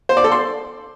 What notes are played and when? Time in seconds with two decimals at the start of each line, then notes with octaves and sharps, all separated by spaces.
0.09 C5
0.17 D5
0.24 A4
0.32 C6